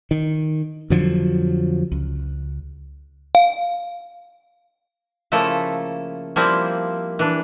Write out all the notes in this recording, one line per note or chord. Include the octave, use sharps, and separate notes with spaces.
D#3
F2 D3 F3 F#3
C#2
F5
C#3 F3 A3 A#3 E4 A4
F3 G3 A#3 C4 E4
E3 D4